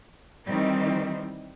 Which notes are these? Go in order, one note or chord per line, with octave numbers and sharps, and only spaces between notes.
D#3 E3 G3 C4